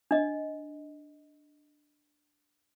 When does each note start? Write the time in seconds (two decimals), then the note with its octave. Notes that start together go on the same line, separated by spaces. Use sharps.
0.11 D4 D#5